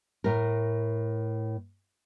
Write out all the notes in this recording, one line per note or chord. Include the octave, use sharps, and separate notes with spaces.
A2 A#4